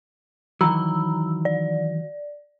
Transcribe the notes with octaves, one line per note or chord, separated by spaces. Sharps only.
D#3 E3 F#3 A#5 B5 E6
D5